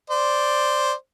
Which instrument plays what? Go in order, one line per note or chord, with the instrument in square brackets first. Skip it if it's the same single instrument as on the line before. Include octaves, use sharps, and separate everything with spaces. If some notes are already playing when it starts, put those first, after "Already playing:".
[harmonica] C5 [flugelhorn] D5